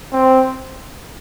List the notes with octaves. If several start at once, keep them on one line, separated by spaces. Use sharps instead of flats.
C4